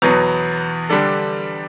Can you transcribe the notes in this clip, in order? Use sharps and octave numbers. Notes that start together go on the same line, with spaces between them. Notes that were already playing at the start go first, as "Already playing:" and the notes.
E2 B2 F#3 B3
D3 G3 D4 A4